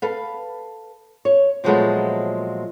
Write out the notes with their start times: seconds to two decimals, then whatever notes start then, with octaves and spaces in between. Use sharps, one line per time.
0.02 A4 B4 F5
1.25 C#5
1.64 A#2 F3 F#3 G#3 A3 B3